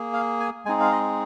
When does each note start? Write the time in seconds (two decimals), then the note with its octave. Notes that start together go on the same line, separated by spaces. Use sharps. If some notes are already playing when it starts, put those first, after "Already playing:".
Already playing: A#3 G#4
0.14 F5
0.40 G#5
0.65 G#3 C4 D#4 G#4 G#5
0.80 F5
0.92 D#5